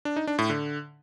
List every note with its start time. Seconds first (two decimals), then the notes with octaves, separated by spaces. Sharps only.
0.05 D4
0.16 D#4
0.27 D4
0.39 A2
0.50 D3